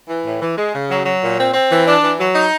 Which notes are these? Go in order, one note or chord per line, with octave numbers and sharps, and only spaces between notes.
E3
A2
E3
G#3
C#3
F#3
F#3
A#2
C4
C4
E3
D4
E3
F#3
D#4